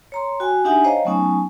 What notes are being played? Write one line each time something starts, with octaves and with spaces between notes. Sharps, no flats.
C#5 A#5 C6
F#4 G5 G#5
D4 D#4 G4 E5 F#5 G#5
C5 C#5 D#5 F5 G5 A#5
F#3 A3 B3 C#4 D#4 G#5